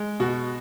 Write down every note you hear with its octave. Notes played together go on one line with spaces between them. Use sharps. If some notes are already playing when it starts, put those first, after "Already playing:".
Already playing: G#3
B2 F#4